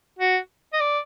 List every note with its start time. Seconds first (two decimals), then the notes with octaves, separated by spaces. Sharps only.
0.19 F#4
0.73 D#5
0.80 D5